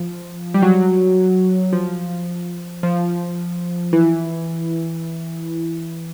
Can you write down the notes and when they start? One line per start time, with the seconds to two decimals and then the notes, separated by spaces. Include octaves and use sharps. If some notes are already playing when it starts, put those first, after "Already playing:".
Already playing: F3
0.54 G3
0.62 F#3
1.73 F3
2.83 F3
3.93 E3